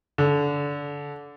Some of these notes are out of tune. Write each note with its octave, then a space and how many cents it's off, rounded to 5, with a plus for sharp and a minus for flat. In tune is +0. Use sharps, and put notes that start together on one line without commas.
D3 -25